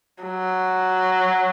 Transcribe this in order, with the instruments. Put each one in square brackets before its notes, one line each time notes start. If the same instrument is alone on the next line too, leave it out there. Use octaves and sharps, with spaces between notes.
[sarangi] F#3